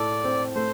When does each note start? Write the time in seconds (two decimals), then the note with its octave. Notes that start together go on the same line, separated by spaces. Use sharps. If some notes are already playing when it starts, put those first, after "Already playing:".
Already playing: A2 A3 A4 D5
0.24 C4
0.55 A3 C5